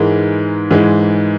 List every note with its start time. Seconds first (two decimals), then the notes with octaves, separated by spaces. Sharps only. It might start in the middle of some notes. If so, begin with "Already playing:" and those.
Already playing: G#2 E3 G#3 A#4
0.71 G#2 E3 G#3